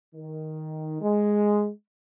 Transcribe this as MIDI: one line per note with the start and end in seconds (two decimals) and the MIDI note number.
0.15 0.98 51
1.01 1.70 56